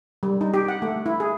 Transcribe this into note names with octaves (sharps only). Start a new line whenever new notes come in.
G3
D#4
G4
F#5
A3
E4
G#4